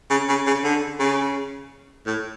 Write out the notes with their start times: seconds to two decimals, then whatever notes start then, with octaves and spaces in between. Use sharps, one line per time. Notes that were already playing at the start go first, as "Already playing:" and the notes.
0.11 C#3
0.29 C#3
0.47 C#3
0.64 D3
1.00 C#3
2.06 A2